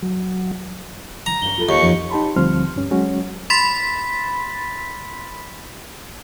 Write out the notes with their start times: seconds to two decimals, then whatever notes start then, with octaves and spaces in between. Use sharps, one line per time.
0.03 F#3
1.26 A#5
1.42 G2 C#5 G7
1.58 F4 A4 B4
1.69 D#2 C#6
1.81 F2 D#3 F3
2.10 D#4 G4 A5 B5 C6
2.36 D2 F3 G3 C4 C6 F6
2.76 G2 C#4
2.91 F#3 G#3 C#4 F#4
3.50 B5 C6 A6 B6